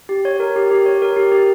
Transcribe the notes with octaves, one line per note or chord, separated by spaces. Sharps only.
G4
C#5
A#4
G4
G4
C#5
A#4
G4
G4